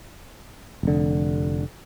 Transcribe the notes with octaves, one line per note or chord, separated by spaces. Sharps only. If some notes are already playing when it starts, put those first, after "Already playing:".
F1 D3